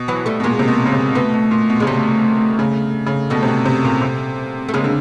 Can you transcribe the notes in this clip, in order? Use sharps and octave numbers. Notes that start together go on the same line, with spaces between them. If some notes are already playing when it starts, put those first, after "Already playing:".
Already playing: B2
E3 F#3
G3 A3
B2
A#2 G#3 A#3
C3
B2
C#3
C3
B2 A3 B3
B2
A#2
B2
C#3 G#3
C3 G3 A3
C#3
C#3
B2 G3 A3
C3
B2
C3
A#2
C3
A3
C#3 G#3 A#3
D3